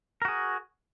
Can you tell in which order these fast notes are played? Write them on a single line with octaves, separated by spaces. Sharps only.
A#4 F#4 G#4